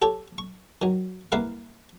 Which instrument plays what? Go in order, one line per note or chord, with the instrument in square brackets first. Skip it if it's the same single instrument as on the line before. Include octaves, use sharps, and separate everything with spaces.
[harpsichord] G4 A4 C#5 G5
C#6
D#3 F#3
C2 A#3 E4 B4 F5 F#5